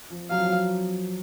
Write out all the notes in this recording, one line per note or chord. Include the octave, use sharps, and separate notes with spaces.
F3
F#3 F5
F3
F#3